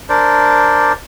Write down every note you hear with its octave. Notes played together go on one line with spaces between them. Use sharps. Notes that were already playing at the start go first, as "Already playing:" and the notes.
D4 A#4 C5 D5